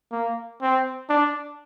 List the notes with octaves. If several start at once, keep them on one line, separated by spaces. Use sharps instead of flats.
A#3
C4
D4